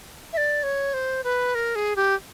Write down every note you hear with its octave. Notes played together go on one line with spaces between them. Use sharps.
E5
D5
C#5
C5
B4
A#4
G#4
G4